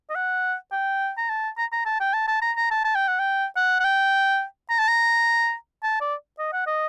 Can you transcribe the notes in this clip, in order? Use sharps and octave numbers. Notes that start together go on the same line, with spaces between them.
D#5
F#5
G5
A#5
A5
A#5
A#5
A5
G5
A5
A5
A#5
A#5
A5
A5
G5
F#5
G5
F#5
F#5
G5
A#5
A5
A#5
A5
D5
D#5
F#5
D#5